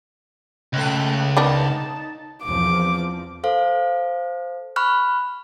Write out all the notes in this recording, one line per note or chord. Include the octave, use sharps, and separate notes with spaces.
C#2 A3 G5 F#6
D#3 B3 D4 D#4 A5
E2 F3 C4 D6
A4 C5 F5
B5 C#6 F6 F#6